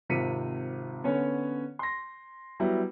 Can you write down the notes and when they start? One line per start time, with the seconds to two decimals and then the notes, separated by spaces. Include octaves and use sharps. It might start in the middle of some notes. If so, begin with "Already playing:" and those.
0.09 G#1 C3 F4 B6 C#7 D#7
1.04 D3 B3 C#4 C#5
1.79 C6 A#6
2.60 F#3 G3 B3 E4